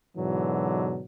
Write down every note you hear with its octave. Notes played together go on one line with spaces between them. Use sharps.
G#2 B2 D3 E3 F#3